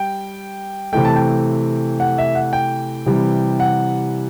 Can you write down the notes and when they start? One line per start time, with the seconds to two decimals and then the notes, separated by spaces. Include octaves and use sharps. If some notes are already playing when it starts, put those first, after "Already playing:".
Already playing: G3 G5
0.92 C3 E3 A3 G5
1.05 A5
1.16 G5
2.00 F#5
2.18 E5
2.35 F#5
2.53 G5
3.06 C3 E3 G3
3.60 F#5